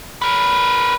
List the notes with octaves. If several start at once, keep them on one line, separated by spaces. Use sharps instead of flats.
A#4 B4